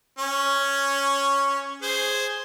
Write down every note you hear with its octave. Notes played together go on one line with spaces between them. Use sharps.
C#4 C#5
G#4 C5